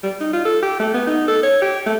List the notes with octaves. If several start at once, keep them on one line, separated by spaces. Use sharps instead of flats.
G3
D#4
F4
A4
G4
A3
B3
D#4
A4
C#5
G4
A3